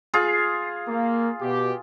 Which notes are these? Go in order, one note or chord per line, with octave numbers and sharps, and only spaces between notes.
F4 G#4
A#3
B2 G4